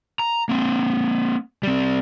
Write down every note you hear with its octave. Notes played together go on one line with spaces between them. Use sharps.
A#5
A#3 C4
G3 C4